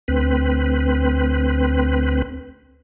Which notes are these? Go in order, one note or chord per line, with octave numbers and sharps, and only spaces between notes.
D2 C4 B4